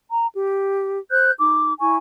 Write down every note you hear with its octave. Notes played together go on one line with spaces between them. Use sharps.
A#5
G4
C5 F#6 G6
D#4 D6
E4 G#5 C#6